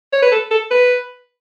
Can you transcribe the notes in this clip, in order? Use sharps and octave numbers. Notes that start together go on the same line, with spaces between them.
C#5
B4
A4
A4
B4